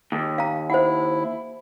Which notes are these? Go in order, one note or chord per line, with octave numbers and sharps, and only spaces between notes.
D#2
F5 A#5
E4 C5 F#5